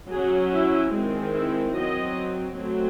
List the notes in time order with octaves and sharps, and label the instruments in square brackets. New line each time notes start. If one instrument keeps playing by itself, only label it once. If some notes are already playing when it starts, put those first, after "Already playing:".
[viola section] F#3 C#4 G#4
E4
D#3 G#3 C4
E4
F#3 C4 D#5
F#3 A3 C4